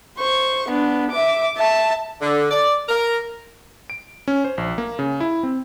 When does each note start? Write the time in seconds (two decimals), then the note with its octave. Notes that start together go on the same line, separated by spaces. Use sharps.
0.18 C5 C#6
0.69 B3 D4
1.11 E5 D6
1.56 E5 A5
2.21 D3
2.51 D5
2.89 A#4
3.90 D7
4.28 C#4
4.44 C5
4.58 A#1
4.78 A#3
4.99 C#3
5.20 E4
5.43 C4